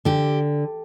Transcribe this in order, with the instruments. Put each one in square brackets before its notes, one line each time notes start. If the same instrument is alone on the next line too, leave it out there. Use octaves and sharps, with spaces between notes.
[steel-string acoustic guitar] D3 G4